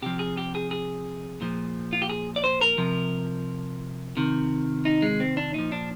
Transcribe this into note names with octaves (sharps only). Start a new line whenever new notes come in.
C3 F3 G4
G#4
G4
G#4
G#4
A#2 F3
F4
G4
G#4
D5
C5
A#4
C3 F3
C3 D#3
D#4
G#3
C4
D4
A#2 F3 D#4
D4